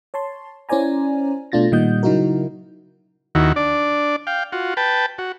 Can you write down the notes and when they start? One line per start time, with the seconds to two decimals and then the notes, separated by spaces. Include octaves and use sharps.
0.14 C#5 A5 C6
0.69 C#4 E4 C5 D5 G#5 A#5
1.52 B2 A3 D4 F4 A6 A#6
1.72 A#2 D#3 G3 D#5 F#5 G6
2.03 C#3 F#3 D#4 E4 F#4 A#4
3.35 D#2 D#3 E4 F#4
3.56 D4 D5
4.27 F5 G5
4.52 F4 F#4
4.77 B4 G5 A5
5.18 F#4